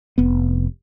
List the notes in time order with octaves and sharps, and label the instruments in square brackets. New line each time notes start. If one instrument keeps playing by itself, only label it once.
[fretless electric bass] F1 B3